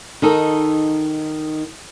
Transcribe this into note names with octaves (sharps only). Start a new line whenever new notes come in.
D#3 D#4 A4